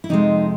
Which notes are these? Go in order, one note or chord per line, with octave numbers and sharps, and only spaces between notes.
E4
F2 C3 F3 G#3 D#4